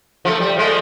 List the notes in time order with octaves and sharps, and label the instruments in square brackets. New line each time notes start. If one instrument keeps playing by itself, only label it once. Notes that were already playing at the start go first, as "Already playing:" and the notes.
[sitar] F3 A3 A4
G3
F3 G#3 A3